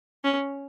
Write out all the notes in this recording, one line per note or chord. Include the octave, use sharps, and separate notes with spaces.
C#4